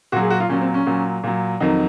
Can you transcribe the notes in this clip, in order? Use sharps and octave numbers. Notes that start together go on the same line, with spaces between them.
A#2 F#3 F#4
G#4
F#4
F4
A#2 F#3 C#4
C4
C#4
A#2 F#3
A#2 F#3
F2 D#3 F#3 D#4